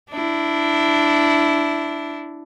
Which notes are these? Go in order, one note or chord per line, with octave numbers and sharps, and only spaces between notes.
D4 E4